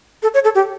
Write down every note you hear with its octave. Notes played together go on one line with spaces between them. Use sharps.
A4
C#5
A4
G4